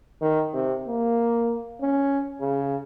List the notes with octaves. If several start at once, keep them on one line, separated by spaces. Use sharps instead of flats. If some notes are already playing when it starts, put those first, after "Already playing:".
D#3
C3
A#3
C#4
C#3